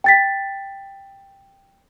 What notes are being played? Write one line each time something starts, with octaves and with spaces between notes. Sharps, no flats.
G5 A6 B6